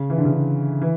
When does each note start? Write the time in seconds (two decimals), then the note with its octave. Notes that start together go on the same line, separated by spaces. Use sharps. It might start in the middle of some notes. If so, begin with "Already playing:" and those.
Already playing: C#3
0.10 E3
0.18 D3
0.25 C#3
0.32 D3
0.81 E3